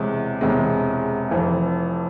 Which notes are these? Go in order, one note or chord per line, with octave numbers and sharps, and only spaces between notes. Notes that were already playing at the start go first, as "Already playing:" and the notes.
Already playing: E1 E2 C3 G#3
E1 E2 C3 G#3
F1 F2 E3